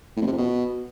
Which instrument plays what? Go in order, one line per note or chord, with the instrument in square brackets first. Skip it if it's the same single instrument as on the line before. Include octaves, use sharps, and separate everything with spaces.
[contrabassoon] A2
F2
C3
F2
B2